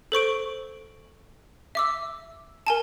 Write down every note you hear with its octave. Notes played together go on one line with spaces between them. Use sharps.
A4 C5 C#6 D7
E5 D6 E6
A#4 G#5 A5